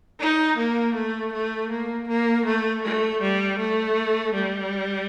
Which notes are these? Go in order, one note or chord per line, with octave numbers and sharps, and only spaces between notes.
D#4
A#3
A3
A3
A#3
A#3
A3
A3
G3
A3
G3